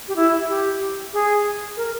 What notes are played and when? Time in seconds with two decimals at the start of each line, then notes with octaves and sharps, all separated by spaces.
0.08 G4
0.16 E4
0.49 G4
1.13 G#4
1.77 A#4